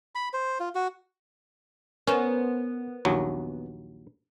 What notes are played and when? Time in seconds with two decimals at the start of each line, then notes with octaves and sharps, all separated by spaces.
0.15 B5
0.33 C5
0.60 F4
0.75 F#4
2.07 B3 C#4 A#4 C5
3.05 A#1 D#2 F#3